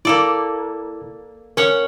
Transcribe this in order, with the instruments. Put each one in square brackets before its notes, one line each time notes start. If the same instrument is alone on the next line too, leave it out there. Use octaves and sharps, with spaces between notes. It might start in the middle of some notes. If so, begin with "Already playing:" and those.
[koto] A#3 A4 D5 [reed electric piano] E4
[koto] C#4 C#5 F#5 [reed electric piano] A#4